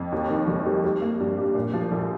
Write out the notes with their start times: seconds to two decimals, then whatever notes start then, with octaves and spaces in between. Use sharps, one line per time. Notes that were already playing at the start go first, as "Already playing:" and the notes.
Already playing: F2
0.12 D#2
0.30 D#3
0.48 F1
0.65 G3
0.84 G3
1.02 A#3
1.20 G2
1.37 G4
1.55 A#2
1.73 F3
1.92 A#1